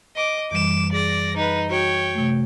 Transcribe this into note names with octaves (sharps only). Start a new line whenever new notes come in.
D#5 D6
F#2 E3 G3 D6 E7
G#4 D5 A#6
D#4 B4
F#4 C#5 G5
C3 A3